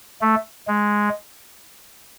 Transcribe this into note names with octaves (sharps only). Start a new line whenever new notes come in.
A3
G#3